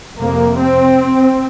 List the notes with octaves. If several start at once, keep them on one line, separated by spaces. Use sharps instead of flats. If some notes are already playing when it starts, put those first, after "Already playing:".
F2 C3 A#3
C4